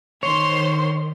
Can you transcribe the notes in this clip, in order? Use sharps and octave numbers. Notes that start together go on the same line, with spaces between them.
D#3 C5 C#5 C6